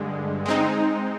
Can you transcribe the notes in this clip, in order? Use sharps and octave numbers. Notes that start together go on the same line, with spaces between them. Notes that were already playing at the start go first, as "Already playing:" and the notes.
Already playing: G2 D3 G#3
G#3 C4 D#4